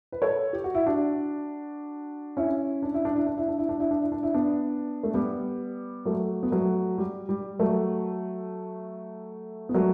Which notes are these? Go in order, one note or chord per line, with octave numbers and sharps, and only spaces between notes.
B4
A4 C#5
G4
F#4
E4
D4 F#4
C#4 E4
D4
E4
D4
E4
D4
E4
D4
E4
D4
E4
D4
E4
D4
E4
B3 D4
A3
G3 B3
F#3 A3
B3
F#3 A3
G3
G3
F#3 A3
B3
F#3 A3